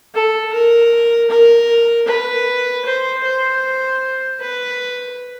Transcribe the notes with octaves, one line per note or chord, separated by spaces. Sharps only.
A4
A#4
A#4
B4
C5
C5
B4